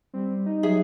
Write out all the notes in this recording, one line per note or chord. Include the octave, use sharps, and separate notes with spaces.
G3 C4
D#4
F#3 G#4 E5